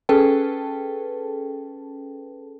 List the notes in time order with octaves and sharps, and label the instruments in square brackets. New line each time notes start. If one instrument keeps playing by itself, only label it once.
[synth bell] C#4 G#4 A4 B4 G5 A5